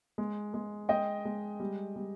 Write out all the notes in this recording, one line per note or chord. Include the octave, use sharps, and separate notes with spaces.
G#3
G#3
G#3 D#5 G5
G#3
G3
G3